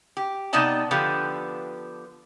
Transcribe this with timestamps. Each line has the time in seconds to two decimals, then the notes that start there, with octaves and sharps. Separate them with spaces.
0.17 G4
0.53 C3 B3 D#4 D5 D#5 A5
0.91 D3 F3 B3 G4 B4